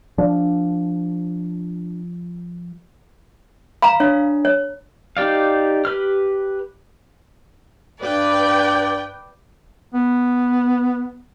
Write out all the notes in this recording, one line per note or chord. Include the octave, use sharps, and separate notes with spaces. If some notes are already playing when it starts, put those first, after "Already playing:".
F3 D4
F5 A#5 B5
D4 C#5
C#5
D#4 G4 D5 F5
G4 B4 F6
G2 B4 D5 G5
B3